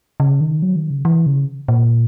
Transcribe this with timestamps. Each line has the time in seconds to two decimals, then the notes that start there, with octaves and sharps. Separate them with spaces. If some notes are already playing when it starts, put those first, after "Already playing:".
0.20 C#3
0.40 D#3
0.62 F#3
0.76 D#3
0.90 C#3
1.05 E3
1.26 C#3
1.68 A#2